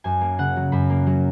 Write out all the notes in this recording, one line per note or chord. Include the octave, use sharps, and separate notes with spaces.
F#2 G#5
A#3
C#3 F#5
F#3
F#2 B5
A#3
F#3